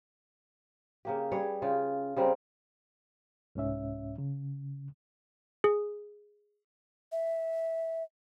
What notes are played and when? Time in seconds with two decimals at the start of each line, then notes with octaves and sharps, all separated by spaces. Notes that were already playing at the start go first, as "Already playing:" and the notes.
1.05 C#3 A#3 G4
1.32 G3 G#4 B4 C#5
1.62 C#3 F4 G5
2.16 C#3 G3 C4 A#4
3.55 C2 G#2 C#4 E5
4.18 C#3
5.64 G#4
7.12 E5